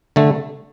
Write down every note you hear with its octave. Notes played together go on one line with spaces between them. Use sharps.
D3 A3